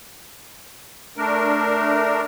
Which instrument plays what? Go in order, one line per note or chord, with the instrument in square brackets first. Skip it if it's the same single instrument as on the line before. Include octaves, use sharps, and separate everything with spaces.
[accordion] A3 D4 A#4